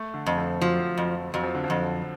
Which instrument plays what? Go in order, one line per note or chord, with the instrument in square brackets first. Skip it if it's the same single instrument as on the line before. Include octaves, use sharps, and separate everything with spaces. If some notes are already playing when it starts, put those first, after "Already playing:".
Already playing: [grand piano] A3
D3
[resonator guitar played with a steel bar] F2
[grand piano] F3
[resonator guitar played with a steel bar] F3 [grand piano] F#3
[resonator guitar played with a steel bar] F2
[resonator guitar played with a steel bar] F2 [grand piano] F#3
[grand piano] F3
D3
F3
[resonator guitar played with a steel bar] F2